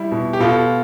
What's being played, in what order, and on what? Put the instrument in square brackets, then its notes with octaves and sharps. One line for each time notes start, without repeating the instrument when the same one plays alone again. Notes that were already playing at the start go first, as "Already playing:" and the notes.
Already playing: [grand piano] G3 E4
B2
G4
B2 F4 A4